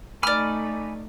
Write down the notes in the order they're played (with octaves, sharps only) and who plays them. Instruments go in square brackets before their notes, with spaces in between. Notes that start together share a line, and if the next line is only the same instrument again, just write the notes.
[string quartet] A3 D#4 [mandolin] D5 F6 [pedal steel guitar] G#5 B5 D6